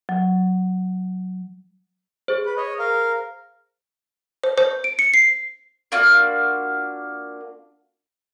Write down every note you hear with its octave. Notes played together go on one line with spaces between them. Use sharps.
F#3
G#4 C5
B4
C#5 D#5
A#4 F5
C5
C5
D7
C#7
C7
A#3 D4 F4 F#4